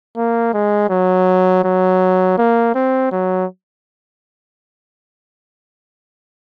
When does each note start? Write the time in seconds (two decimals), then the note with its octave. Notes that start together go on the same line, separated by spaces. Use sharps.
0.17 A#3
0.54 G#3
0.90 F#3
1.64 F#3
2.38 A#3
2.74 C4
3.12 F#3